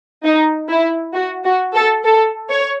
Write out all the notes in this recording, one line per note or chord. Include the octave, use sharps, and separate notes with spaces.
D#4
E4
F#4
F#4
A4
A4
C#5